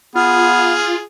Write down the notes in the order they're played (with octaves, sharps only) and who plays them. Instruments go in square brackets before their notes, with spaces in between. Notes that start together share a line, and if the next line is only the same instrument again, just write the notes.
[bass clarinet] B3 [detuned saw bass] F4 [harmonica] G#4 [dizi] F6